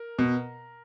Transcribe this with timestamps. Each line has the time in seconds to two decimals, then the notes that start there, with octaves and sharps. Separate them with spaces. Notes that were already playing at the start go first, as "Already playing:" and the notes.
Already playing: A#4
0.19 B2